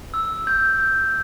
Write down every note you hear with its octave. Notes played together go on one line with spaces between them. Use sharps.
E6
G6